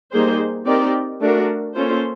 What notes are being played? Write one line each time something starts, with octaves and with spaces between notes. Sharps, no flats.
G3 A#3 D#4 G#4 C5
C4 D#4 G4 A#4 D5
A3 D4 F#4 A#4
A#3 C#4 F4 A4 C5